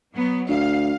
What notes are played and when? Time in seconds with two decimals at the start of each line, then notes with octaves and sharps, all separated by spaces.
0.13 F#3 B3
0.49 D2 F5